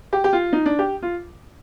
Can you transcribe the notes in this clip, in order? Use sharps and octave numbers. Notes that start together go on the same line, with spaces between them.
G4
G4
F4
D#4
D4
G4
F4